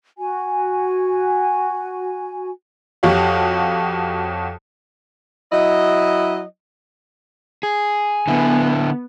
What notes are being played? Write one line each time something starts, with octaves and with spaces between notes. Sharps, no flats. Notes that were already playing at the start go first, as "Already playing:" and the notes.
F#4 G#5
F2 F#4 G4 C#5 F5
F#3 E4 D#5
G#4
D3 B3 E4